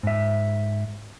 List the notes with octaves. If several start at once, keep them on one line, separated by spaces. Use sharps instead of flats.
G#2 E5